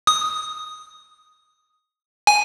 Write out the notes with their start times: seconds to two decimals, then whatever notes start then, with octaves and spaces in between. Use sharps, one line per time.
0.07 D#6
2.27 G#5